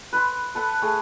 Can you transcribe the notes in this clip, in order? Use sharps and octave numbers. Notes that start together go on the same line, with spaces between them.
B4 B5 C6
A4 B4 F#5 A5
A3 G#4